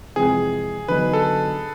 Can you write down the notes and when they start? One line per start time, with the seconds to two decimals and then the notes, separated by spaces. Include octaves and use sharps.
0.16 F2 C3 E3 G#3 C4 G#4
0.88 D3 F#3 B3 D#4 B4
1.13 A4